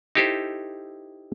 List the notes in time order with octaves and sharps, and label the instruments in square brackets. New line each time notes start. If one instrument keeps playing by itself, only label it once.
[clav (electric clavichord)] D#4 E4 G4 A4 C5